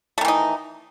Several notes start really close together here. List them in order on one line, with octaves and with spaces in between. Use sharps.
A3 D#3 E3 D#4